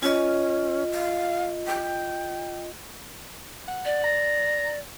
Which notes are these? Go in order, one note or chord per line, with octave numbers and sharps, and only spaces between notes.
C#4 F4 D#5
F5
G5
F#5
D5
A#5